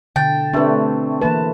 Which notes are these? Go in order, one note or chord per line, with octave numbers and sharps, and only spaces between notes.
B2 D3 G5 A5
C3 A3 C4 D4 B4
E3 A#3 B4 A5